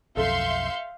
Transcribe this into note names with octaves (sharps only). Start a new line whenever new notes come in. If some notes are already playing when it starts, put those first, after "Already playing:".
B1 F2 A4 E5 F5 C6 G6 C#7